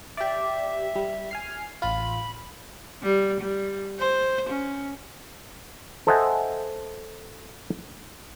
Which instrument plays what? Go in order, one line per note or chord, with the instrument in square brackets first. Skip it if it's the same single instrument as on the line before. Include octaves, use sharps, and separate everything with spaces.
[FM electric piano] G4 D5 [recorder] E5
[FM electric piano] G3
G#5 F6 C7
[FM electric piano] A1 F4 [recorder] B5
[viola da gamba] G3
G3
C5
C#4
[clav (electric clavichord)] A4 C5 D#5 E5 F#5 G#5